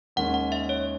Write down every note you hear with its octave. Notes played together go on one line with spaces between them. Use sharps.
D#2 D#3 G#3 C#4 F#5
F#5
E5
C#5